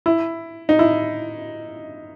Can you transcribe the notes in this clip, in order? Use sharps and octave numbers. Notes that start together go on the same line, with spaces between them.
E4
D#4
E4